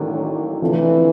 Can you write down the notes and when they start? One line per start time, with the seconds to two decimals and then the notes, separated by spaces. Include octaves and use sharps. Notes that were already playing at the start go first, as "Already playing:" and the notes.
Already playing: A1 A2 D#3 F#3 A#3 D4
0.61 D2 C3 E3 F3 A3 D4